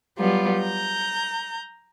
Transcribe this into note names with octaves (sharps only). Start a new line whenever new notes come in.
F#3 G3 B3 F4
A#5 G6